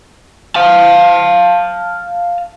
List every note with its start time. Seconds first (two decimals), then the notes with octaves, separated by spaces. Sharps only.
0.55 F5 A5